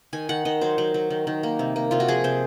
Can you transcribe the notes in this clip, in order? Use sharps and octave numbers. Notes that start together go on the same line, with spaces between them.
D#3 G#5
D#3 F#5
D#3 D#5
F#3 C5
F#3
F#3
D#3
D#3
A#3
C3
A#3
C3 F4
F#4
F3 G#4
C3 C5